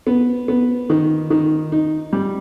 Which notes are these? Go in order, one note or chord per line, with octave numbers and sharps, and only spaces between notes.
B3
B3
D#3
D#3
D#4
G3